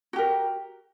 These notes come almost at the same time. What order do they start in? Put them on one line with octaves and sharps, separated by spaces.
F#4 G4 A#4